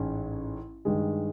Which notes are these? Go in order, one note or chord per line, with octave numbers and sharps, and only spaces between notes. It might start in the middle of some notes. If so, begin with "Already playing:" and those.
Already playing: A1 G#2 E3 G#3 C#4
G2 D#3 G#3